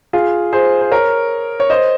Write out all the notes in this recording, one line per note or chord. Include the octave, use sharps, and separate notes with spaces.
F4 G#4
G#4 C5
C5
A#4 C#5
C#5
C5 D#5